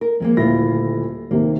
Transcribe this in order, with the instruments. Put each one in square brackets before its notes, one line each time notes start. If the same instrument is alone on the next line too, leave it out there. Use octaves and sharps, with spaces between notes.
[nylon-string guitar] A#4
[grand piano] F2 [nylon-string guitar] D#3 G#3 A#3
[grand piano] D#1 E4 A#6 [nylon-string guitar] D2 F4
[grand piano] D#2 C3 D#3 [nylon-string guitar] A#3